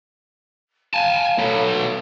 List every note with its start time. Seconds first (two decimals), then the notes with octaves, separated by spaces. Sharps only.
0.94 F5 G#5 A5
1.39 F#3 A3 B3